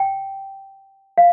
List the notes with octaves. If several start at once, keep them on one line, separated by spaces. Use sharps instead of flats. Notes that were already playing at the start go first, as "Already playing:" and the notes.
Already playing: G5
F5